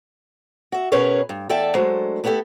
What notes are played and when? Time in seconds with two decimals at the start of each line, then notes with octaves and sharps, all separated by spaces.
0.72 F#4 E5
0.92 B2 C#4 G#4 A#4 B4 C#5
1.29 G2
1.49 E2 A4 D5 E5 G5 A5
1.75 F#3 G#3 A3 D4 C5
2.24 A3 B3 E4 G4 A4